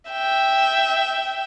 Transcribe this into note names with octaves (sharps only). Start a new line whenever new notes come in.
E5 G5